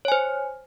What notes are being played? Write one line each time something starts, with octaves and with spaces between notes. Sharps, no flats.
C5 C#5 G#5